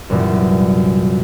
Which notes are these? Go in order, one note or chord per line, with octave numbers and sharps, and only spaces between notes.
C2 F#2 A#2 E3